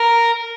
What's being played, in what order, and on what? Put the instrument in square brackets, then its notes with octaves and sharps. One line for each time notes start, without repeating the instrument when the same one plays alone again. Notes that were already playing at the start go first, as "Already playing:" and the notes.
Already playing: [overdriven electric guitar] A#4